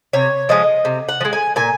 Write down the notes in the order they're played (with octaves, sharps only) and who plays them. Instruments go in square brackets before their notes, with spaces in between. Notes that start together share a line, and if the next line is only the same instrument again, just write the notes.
[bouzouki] C3 C#5
F3 G#3 D#5
C3
F#5
F3
G#3
G#5
A#2 G#5